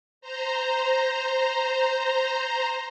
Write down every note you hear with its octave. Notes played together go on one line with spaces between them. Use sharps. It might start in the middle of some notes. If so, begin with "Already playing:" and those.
C5 A#5